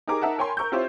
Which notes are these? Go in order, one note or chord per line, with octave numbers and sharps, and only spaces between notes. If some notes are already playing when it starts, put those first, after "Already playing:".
D#4 G4 G#4 A#4 D6
D#4 A#4 E5 F#5 A5
A#4 C#5 G5 G#5 B5 C6
A#4 C#6 E6 G6
C4 E4 F4 G4 C5 C#5